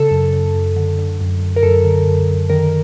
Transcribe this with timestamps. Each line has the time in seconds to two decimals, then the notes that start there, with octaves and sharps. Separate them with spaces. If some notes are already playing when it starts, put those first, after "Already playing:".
Already playing: C#3 A4
0.11 F#2
0.33 F#2
0.55 F#2
0.76 D3
0.98 D3
1.21 F#2
1.42 F#2
1.56 A#4
1.63 F#2 A4
1.85 D3
2.07 F#2
2.29 F#2
2.50 D#3 A#4